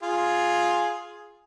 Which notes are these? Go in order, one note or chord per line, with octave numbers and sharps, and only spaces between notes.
F4 G#4